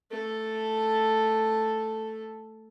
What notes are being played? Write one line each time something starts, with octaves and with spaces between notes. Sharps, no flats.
A3 A4